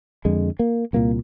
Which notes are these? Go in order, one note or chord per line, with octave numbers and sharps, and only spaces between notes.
F2 D3 G#3
A#3
C2 A#2 A#3